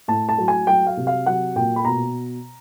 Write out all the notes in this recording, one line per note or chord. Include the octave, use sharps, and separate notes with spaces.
A2 A5
A5
F#3
G#5
F#3 G5
F5
C3
F5
F#3 F#5
A#2 G5
B5
B2 A#5